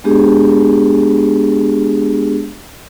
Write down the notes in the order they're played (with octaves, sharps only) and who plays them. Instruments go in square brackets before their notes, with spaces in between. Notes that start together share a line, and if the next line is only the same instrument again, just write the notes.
[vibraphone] G#3 B3 D4 G4 G#4